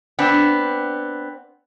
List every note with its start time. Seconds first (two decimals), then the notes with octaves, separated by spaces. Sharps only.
0.19 B3 C4 D4